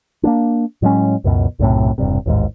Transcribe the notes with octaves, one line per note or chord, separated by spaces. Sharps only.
A#3 B3 D4
A2 F#3 G#3 C#4
C#2 F#2 B2
B1 F#2 A2 C3
E1 G2 C3
A1 D#2 G#2